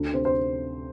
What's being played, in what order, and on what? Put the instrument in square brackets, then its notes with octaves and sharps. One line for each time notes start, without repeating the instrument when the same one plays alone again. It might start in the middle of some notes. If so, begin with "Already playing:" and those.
Already playing: [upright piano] D2
C3 C5
C5